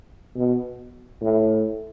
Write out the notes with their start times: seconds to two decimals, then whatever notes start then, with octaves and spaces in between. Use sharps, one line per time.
0.36 B2
1.22 A2